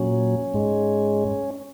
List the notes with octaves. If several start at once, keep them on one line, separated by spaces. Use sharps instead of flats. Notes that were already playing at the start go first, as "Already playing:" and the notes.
Already playing: A#2 F#3 C#4
G#2 G#3